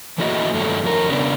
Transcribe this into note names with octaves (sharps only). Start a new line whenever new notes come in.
E3 A3 A#3 F#4 D#5
G2 D#3 F#3 A3 A4
F2 A#4
C#3 B3 D4